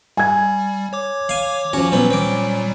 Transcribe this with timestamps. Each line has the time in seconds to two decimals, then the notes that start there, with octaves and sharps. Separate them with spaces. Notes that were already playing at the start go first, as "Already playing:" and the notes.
0.17 G3 G#5 G#6
0.93 C#5 D6
1.29 F5 G#5
1.73 F3 C#4 F#4
1.92 A#2 F#3 G3 B3 C4
2.11 C4 D6